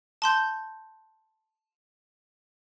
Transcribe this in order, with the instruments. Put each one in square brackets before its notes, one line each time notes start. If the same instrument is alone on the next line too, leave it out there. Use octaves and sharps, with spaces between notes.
[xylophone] A5 C6 G6